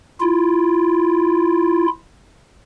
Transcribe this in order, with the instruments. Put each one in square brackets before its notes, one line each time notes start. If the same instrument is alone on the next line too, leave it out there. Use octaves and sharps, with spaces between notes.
[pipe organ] E4 F4